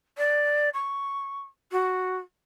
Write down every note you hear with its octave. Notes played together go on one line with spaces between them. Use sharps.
D5
C#6
F#4